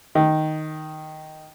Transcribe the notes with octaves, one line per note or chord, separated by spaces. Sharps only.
D#3